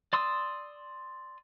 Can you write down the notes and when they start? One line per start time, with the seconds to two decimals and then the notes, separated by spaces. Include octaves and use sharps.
0.13 D5 C6 D#6 E6